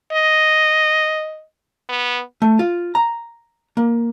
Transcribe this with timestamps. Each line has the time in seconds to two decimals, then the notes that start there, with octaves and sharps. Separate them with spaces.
0.12 D#5
1.89 B3
2.42 A3
2.59 F4
2.95 A#5
3.77 A#3